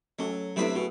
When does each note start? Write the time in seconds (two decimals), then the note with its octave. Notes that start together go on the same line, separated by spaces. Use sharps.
0.19 F#3 A3 C#4 A4
0.56 C3 F#3 A3 D4 E4 B4
0.75 B2 F#4 G#4